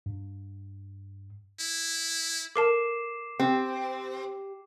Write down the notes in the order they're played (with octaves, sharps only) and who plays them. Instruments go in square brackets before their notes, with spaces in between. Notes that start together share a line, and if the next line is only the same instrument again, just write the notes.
[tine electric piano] G2
[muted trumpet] E4
[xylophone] A4 A#4 A5 [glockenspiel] D6 C7 E7
[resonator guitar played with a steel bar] C4 [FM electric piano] G4